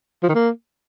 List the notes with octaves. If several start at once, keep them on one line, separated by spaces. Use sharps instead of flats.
F3
D#3
A#3